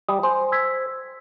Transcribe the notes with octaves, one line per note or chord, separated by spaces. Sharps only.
G3 D#6
C5 G#5
E6 G#6 B6